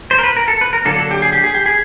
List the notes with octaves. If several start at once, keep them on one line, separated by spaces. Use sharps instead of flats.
C5
A#4
B4
A#4
A4
B4
A#4
D3 F#3 A#3 A4
A4
G4
G#4
G4
G#4
G4
G#4